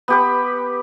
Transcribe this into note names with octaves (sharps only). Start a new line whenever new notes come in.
B3 G4 B4